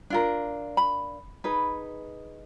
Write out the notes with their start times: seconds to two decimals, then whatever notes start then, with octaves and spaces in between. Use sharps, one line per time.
0.10 D4 F4 A#4
0.77 B5
1.44 D#4 G#4 B4